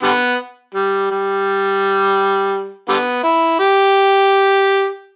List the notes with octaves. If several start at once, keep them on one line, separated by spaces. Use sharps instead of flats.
D3 G3 B3
G3
G3
D3 G3 B3
E4
G4